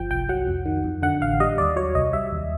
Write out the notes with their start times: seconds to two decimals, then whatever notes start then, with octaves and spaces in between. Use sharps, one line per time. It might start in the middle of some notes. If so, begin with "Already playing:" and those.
Already playing: G1 F3 G5
0.10 C2 G5
0.29 F#3 F#5
0.47 F2
0.66 D#3
0.84 F2
1.03 D3 F#5
1.21 A1 F5
1.40 G3 D#5
1.58 D#2 D5
1.76 F#3 C#5
1.95 C2 D#5
2.13 G3 E5
2.32 D#2